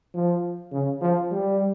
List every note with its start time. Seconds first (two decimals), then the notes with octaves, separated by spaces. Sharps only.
0.14 F3
0.72 C#3
1.01 F3
1.31 G3